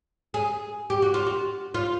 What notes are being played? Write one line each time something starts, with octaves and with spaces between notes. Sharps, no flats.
G#4
G4
F#4
F4
F#4
F4